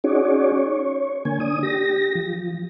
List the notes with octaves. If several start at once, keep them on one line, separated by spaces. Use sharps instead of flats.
C#4 D#4 F#4 G#4 C#5 D5
C#5
D3 A#3 G#5
D4 D#6
G4 A#6
F3